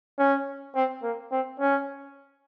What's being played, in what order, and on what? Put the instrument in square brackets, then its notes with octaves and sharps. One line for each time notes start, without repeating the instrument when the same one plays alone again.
[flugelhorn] C#4
C4
A#3
C4
C#4